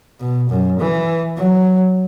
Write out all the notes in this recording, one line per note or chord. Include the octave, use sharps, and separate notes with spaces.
B2
F#2
E3
F#3